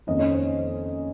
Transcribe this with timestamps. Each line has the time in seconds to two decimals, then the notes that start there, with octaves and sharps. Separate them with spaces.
0.07 F2 D#3 A#3 C#4 D#4 D#5
0.19 C#4 C#5
0.32 C5